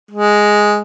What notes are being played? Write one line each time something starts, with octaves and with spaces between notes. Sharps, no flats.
G#3